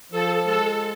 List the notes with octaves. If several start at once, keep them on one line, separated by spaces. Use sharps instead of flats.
F3 A4
G#3 A4